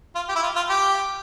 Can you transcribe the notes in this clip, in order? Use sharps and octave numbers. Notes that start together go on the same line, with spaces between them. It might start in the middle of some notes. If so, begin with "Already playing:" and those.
F4
G4
E4
F4
F4
G4